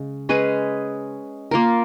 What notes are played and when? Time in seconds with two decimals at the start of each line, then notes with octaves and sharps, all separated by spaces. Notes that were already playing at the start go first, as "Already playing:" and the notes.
Already playing: C#3 G#3
0.29 G#3 C#4 G#4 B4
1.51 A#3 F4 A#4